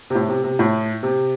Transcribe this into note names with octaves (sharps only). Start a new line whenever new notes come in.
C3
A2
C3
C3
A2
C3